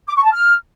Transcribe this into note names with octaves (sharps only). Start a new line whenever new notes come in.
D6
C#6
A5
F6